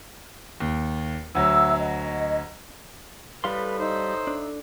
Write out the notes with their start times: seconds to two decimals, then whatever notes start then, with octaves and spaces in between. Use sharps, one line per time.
0.60 D#2
1.35 D2 F#3 E5 E6
1.78 D#5
3.44 A2 G3 B4 F5 C6
3.79 D#4 C5 E6
4.27 D4